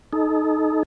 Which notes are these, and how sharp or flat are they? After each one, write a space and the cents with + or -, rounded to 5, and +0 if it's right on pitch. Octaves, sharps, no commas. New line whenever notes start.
D#4 +0 A4 -30